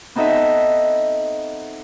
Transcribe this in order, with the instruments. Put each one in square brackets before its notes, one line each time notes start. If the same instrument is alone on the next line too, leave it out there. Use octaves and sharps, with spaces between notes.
[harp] B3 C4 D#4 A4 D#5 E5